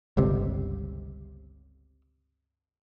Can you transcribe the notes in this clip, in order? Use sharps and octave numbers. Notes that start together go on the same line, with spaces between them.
G1 C#2 C3